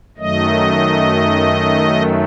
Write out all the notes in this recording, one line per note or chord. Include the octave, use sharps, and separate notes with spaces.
F#2 D#3 F#3 A3 D#5